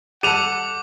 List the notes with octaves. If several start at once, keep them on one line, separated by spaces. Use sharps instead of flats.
G3 A4 F#5 D6 D#7 F7